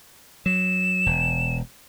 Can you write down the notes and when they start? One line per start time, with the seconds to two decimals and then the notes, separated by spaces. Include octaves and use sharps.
0.46 F#3 E7
1.06 E1